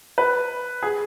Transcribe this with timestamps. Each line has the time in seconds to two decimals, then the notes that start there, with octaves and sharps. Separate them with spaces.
0.18 B4
0.83 G#4